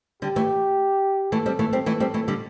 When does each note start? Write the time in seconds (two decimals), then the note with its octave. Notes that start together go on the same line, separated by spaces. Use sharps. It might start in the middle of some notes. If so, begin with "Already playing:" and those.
0.22 D3 G3 G4
0.36 E3 A3
1.32 E3 A3 A4
1.46 G3 C4
1.59 E3 A3
1.73 G3 C4
1.86 E3 A3
2.00 G3 C4
2.14 E3 A3
2.28 D3 G3